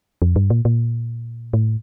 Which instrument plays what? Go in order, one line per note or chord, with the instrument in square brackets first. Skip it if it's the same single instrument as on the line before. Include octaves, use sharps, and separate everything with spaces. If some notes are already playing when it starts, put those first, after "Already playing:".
[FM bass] F2
G2
A#2
A#2
A2